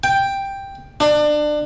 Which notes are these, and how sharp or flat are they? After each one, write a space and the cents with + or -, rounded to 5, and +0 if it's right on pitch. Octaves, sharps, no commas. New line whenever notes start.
G5 +5
D4 +25